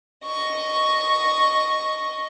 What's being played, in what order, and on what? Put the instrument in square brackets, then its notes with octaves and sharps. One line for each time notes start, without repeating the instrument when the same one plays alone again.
[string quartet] D#5 C#6